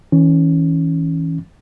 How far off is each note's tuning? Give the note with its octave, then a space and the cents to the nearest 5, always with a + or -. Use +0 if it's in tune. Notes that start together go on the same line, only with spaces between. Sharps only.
E3 -30 C#4 +0